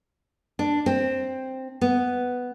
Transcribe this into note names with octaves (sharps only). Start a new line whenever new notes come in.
D4
C4
B3